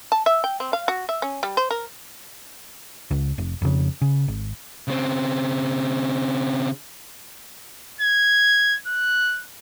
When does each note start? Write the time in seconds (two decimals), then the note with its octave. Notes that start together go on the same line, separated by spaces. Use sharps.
0.12 A5
0.26 E5
0.44 G5
0.60 C4
0.73 F5
0.88 F#4
1.09 E5
1.22 C#4
1.43 G3
1.57 C5
1.71 A#4
3.11 C#2
3.38 F1
3.62 F2 C#3
4.02 C#3
4.28 G#1
4.88 C#3 C4
8.01 G#6
8.87 F#6